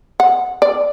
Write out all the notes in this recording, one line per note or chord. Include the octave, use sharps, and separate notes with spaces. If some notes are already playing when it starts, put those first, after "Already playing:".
F#5
D5